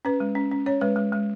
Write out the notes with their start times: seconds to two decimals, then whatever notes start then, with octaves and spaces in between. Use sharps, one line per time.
0.05 C#4 B4
0.20 G#3
0.35 C#4
0.51 C#4
0.66 C#4 C#5
0.81 G#3 B4
0.96 G#3
1.13 G#3